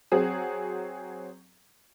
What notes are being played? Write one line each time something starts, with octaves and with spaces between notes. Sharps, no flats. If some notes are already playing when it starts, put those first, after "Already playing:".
F#3 C4 G#4